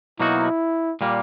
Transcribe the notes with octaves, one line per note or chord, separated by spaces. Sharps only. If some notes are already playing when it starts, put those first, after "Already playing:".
B2 F#3 A#3 D#4 E4 F#4
A#2 G3 A#3